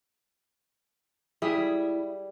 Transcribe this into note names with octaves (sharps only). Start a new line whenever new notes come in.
G3 E4 G#4 E5 D#6